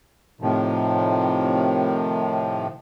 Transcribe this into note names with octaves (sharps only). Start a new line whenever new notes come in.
A2 C3 D#3 F3